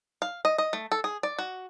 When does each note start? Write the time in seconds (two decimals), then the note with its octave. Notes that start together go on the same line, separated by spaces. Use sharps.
0.22 F5
0.45 D#5
0.58 D#5
0.73 A3
0.92 A4
1.04 G#4
1.23 D5
1.39 F#4